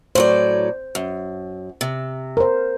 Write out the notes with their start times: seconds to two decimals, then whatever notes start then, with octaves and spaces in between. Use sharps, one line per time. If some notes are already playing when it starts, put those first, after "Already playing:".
0.15 A2 F#3 C5 D5
0.95 F#2
1.81 C3
2.37 A#4 C5